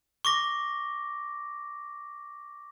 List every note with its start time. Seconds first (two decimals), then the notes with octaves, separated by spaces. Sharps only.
0.25 C#6 D6 A#6